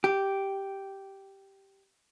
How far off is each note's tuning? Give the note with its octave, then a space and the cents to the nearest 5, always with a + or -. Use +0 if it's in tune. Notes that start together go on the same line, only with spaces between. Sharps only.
G4 -5